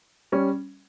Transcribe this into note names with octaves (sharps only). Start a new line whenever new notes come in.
G3 C#4